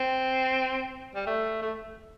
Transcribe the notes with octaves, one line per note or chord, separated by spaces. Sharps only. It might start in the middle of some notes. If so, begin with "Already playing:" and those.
Already playing: C4
G3
A3
A3